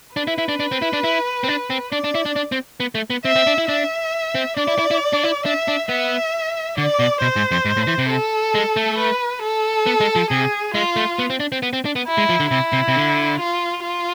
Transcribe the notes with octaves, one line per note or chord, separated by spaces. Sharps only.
D4 B4
E4
E4
D4
D4
C4
E4
D4
E4
C4
D4
C4
D4 D5
D4
E4
D4
D4
C4
B3
A3
B3
C4 E5
C4
D4
E4
D4 E5
C4
D4 D5
E4
E4
E4
D4
E4
D4 E5
D4
B3 E5
D3 D5
B2
B2 C5
G#2
F2
G#2
A2
E3
C3
A4
G#3
A3
B4
A4
B3
G#3
F3
C3 G#4
G#3 F4
A3
B3
C4
D4
C4
B3
C4
D4
B3
E4
G#3
F3
D3
C3 E4
C3
C3
D3
F4
F4